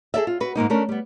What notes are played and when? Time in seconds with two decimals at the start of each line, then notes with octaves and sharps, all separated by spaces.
0.14 G#4 A4 D5 E5
0.27 F4
0.40 F#4 B4
0.55 G#2 B2 A#3 D#4
0.70 A3 C#4 D4 A#4
0.89 G3 B3